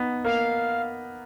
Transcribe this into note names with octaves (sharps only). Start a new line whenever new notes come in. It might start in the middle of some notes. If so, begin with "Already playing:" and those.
Already playing: B3 D#4
A#3 F5